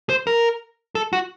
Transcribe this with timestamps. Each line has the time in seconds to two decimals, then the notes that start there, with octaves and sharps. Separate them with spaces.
0.09 C5
0.27 A#4
0.95 A4
1.13 F#4